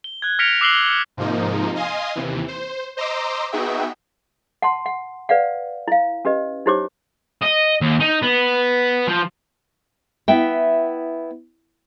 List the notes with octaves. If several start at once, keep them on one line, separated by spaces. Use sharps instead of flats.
G7
F#6 G#6
F6 A#6 B6 C#7 D7 F7
D6 E6 F#6 C7 F#7 G7
F6 C#7
G#2 C3 F3 A#3 D#4
D#5 F5 G#5 C6 D#6
D#2 C3 E3
C5
C5 D#5 A#5 C6 D6 E6
B3 D#4 F#4 G#4 E5 G5
F#5 A5 C6
F#5
B4 D5 F5 F#5
E4 F5
C#4 G4 B4 D#5
D#4 E4 G4 C5 C#5 D6
D#5
D#2
D#4
B3
F3
B3 E4 E5 G5